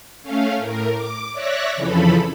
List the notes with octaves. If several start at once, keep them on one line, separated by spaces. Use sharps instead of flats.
A3 C#4 F5
A2 A#4
D6
C#5 D5 E5 F#6 A#6
F2 C#3 E3 F3 A4 B5